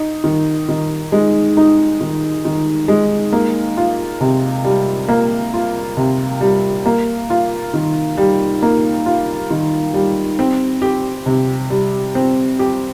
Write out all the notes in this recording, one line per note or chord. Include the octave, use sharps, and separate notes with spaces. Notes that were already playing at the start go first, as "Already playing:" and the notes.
Already playing: D#4
D#3
D#3
G#3
D#4
D#3
D#3
G#3
A#3
F4
C3
G3
A#3
F4
C3
G3
A#3
F4
D#3
G3
A#3
F4
D#3
G3
C4
G4
C3
G3
C4
G4